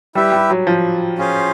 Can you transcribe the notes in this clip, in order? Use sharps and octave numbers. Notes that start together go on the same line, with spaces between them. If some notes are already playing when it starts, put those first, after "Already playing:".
G3 E4 G4 B4 E5
G3
F#3
F3
C#4 F4 G#4 C5 F5